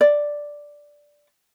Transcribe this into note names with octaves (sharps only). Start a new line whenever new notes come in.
D5